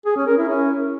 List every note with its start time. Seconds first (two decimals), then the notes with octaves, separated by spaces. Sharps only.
0.06 G#4
0.16 C#4
0.27 A#4
0.37 E4
0.48 C#4